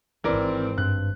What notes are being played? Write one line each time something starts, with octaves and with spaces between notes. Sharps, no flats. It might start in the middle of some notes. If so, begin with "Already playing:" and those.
G#1 E3 C4 A#4 D5
G2 F#6